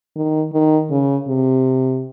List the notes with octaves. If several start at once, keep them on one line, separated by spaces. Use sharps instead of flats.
D#3
D#3
C#3
C3